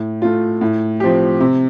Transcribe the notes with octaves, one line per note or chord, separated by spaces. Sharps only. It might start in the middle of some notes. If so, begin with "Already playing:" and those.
Already playing: A2
A3 F4
A2
F3 C4 G4
C3